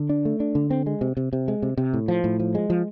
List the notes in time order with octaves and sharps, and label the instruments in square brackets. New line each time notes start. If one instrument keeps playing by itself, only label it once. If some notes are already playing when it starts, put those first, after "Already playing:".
Already playing: [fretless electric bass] D3
D4
A3
D4
D3
C4
G#3
C3
C3
C3
G#3
C3
C3
A2
F3
A2
F3
G#3
F3